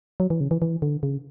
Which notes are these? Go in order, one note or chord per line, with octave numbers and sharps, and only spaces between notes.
F#3
E3
C#3
E3
E3
D3
C#3